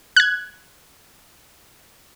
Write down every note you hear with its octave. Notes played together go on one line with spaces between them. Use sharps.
F#6 G#6